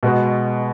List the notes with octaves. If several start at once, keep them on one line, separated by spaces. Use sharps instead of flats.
B2 G#3 B3 F#4